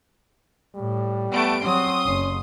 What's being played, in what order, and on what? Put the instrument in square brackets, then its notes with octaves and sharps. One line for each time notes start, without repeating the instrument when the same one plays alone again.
[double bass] A2 [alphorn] G3
[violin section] A3 D7 [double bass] B3
[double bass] F#3 C4 [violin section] C6 D#6
[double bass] F#1 [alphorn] C#4